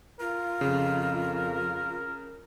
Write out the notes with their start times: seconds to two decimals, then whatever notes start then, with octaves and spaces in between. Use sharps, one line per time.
0.20 F4 A#4
0.61 F2 C#3